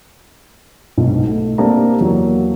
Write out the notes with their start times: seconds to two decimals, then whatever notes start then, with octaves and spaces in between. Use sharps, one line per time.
0.97 B1 G#2 B2
1.26 A3
1.58 A#3 C4 D4 G4 A5 A#5
2.01 E2 F#3 A#3